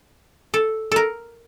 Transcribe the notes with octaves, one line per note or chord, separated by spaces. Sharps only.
A4
A4 A#4